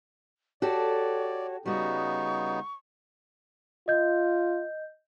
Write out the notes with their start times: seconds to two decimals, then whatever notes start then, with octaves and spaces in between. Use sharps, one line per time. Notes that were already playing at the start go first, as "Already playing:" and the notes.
0.62 F#4 G4 A4 C#5 D5
1.66 C#3 G3 B3 D#4 F#4 C#6
3.88 F4 D#5 G6